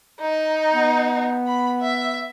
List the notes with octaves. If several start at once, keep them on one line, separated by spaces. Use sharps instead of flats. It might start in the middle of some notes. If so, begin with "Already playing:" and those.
D#4
B3
B5
E5